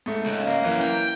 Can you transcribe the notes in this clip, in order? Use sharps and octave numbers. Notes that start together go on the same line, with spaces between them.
G#2 A3
C#2
A#3
F#2 E3
G5